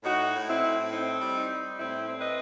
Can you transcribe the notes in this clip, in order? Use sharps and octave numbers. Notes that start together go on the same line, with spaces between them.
A2 D#4 F#4
A2
C4 E4
A2
C4 D#4
G3
D#4
G3
A2 C4 E4
C4
B4 D#5